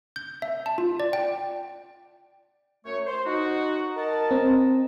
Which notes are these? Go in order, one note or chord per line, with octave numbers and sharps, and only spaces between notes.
G6
E5
A5
F4
D5
G5
F#2 A3 C#5
C5
D#4 F#4
A#4 D#5 A5
C4